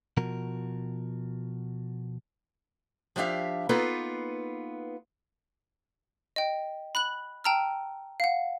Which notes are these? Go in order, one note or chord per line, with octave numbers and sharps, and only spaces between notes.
B2 F3 F#4 A#4
F3 D4 G4 E5 F5
A#3 B3 D#4 F4 A4 B4
D#5 G5
B5 F#6 F#7
G5 A5 A#5 E6 F6
F5 F#5